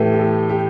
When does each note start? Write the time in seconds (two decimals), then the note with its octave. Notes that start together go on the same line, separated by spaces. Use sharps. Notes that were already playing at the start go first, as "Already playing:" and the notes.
Already playing: A2 E3 A3 G4 A4
0.13 G4
0.19 A4
0.49 G4